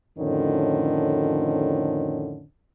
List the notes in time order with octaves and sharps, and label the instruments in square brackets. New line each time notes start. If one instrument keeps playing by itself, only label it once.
[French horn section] F2 A2 D3 D#3 C#4